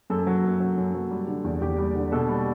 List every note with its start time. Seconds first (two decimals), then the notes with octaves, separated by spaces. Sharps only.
0.10 F#2 A4
0.27 F#3
0.44 F#2
0.60 F#3
0.77 F#2
0.94 F#3
1.11 G3
1.28 D3
1.44 E2
1.61 E2 G4
1.78 G3
1.95 D3
2.12 B2 A4
2.29 G3